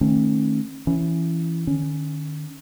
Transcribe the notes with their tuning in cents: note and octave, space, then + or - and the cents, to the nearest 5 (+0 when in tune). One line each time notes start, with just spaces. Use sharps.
D#3 -5 A3 +0 C#4 -35
E3 +10 C#4 +0
D#3 -45 C#4 +0